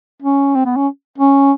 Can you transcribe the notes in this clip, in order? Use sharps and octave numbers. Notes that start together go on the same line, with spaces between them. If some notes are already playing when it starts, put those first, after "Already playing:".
C#4
C4
B3
C#4
C#4